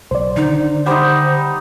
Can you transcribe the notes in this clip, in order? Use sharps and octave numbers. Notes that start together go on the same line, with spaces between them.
B1 C5 D5
D3 D#3 D4 D#4
G3 D#4 C5 F#5 B5 C6